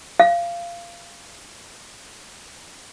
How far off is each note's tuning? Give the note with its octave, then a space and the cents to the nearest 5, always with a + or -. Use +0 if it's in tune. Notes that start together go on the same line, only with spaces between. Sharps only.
F5 -20